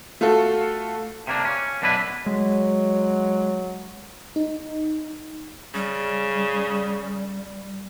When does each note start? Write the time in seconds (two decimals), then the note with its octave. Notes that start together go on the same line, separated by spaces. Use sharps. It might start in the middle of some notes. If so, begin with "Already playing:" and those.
0.21 A3 F4 F#4 A4
1.27 C3 A#3 D4
1.45 C#4
1.82 F#2 B2 D4 E4 B4
2.26 F#3 G#3
4.36 D#4
5.74 C#3 G3